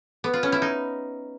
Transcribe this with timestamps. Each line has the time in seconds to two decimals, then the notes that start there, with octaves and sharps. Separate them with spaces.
0.24 B3
0.33 F4
0.43 C#4
0.52 E4
0.62 D#4